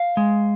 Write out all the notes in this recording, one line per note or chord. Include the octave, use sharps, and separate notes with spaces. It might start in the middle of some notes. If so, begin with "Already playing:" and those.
Already playing: F5
G#3